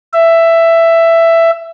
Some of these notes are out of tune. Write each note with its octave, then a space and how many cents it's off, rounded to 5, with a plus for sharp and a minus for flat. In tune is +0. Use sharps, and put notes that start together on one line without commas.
E5 +10